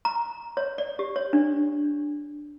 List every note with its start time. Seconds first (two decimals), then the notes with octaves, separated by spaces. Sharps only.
0.05 A#5
0.57 C#5
0.78 D5
0.99 G4
1.16 C#5
1.33 D4